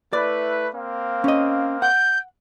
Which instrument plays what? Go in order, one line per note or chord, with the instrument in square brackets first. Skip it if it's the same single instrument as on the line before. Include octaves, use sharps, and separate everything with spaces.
[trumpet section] A3 E4 B4 [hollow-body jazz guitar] D5
[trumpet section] A#3 C4 F5
[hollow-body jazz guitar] C#4 D#5
[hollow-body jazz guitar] F#5 [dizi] G6